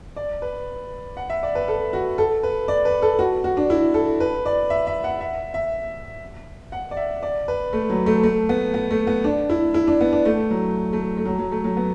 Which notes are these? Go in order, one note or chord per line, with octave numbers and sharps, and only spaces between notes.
D5
B4
F#5
E5
D5
B4
A4
F#4
A4
B4
D5
B4
A4
F#4
F#4
D4
E4
A4
B4
D5
E5
E5
F#5
E5
E5
F#5
D5
E5
D5
B4
A3
F#3
A3
A3
B3
B3
A3
B3
D4
E4
E4
D4
B3
D4
A3
F#3
A3
A3
F#3
F#3
A3
F#3
B3